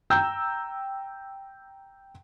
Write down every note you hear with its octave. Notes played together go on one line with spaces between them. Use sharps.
G5 A#5 E6 G6